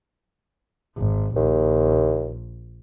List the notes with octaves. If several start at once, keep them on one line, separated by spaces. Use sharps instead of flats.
G#1
A#1 D#2